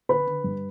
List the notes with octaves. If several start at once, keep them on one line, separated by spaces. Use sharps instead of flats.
D3 B4 B5
D3
G2